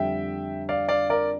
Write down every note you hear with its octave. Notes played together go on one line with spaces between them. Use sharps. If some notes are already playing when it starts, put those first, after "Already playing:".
Already playing: F2 D3 G3 E5 G5
D5 F5
D5 F5
A#4 D5